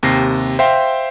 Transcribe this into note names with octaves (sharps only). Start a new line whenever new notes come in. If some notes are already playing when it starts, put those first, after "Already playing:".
D#2 C3 A#6 C7
C5 E5 F5 G5 C6